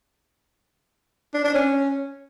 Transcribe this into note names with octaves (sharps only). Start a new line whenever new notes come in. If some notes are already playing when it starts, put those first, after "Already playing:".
D4
D4
C#4